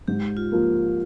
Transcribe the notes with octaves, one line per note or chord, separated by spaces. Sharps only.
G#2 G4
F4
F3 A#3